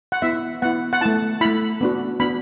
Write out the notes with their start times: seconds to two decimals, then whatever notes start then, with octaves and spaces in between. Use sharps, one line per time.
0.12 F#5
0.22 B3 E4 E5
0.62 B3 E4 F#5
0.93 F#5
1.01 A3 E4 A5
1.41 A3 E4 B5
1.81 B3 D4 F#4
2.20 B3 D4 F#4 B5